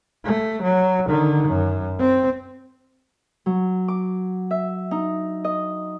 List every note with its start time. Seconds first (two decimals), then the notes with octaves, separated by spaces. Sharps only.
0.25 A3
0.63 F#3
1.08 D3 D#3
1.48 F#2
1.99 C4
3.46 F#3
3.88 D6
4.51 E5
4.91 D#4
5.44 D#5